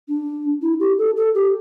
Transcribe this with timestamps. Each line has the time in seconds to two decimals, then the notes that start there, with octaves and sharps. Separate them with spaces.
0.08 D4
0.62 E4
0.80 G4
0.98 A4
1.17 A4
1.35 G4